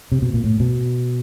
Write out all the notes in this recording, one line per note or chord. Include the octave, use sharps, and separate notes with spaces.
C3
B2
A#2
A2
B2